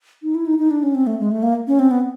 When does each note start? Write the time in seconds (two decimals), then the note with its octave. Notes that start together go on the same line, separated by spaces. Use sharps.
0.23 D#4
0.35 E4
0.46 D#4
0.58 D#4
0.71 D4
0.83 C#4
0.95 C4
1.07 A3
1.19 G#3
1.31 A3
1.43 A#3
1.67 C#4
1.79 C4
1.91 B3